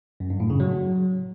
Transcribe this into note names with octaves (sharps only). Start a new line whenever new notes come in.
F#2
G2
A2
C#3
F#3